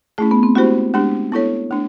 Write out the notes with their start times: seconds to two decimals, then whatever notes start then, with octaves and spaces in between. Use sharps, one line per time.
0.18 A3 C#4 E4 G#4
0.31 B3
0.43 C4
0.55 G#3 C#4 E4 F#4 G4 C5
0.94 G#3 B3 D4 G4
1.32 B3 E4 A4 C#5
1.71 A3 D4